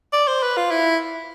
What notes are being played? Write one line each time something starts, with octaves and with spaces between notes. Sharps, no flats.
D5
C5
B4
F4
E4